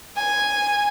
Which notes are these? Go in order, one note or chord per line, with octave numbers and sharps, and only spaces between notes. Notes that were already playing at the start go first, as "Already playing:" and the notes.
G#5